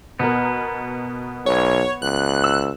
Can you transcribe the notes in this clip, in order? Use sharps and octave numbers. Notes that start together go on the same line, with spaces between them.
B2 B3 A#4
B1 C#5
C#2 F#6
E6